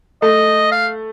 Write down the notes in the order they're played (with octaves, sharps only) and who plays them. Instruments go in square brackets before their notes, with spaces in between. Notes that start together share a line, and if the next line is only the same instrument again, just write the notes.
[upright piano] A3 [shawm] D#5
[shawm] F5